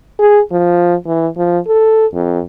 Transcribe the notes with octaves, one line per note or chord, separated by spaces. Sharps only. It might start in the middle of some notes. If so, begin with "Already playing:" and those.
G#4
F3
E3
F3
A4
F2